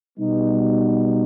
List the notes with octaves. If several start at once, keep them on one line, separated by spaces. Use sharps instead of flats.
B2 G3 B3 D#4